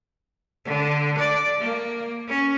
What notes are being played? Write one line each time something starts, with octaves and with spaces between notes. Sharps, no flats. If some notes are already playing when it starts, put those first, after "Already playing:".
D3
D5
A#3
C#4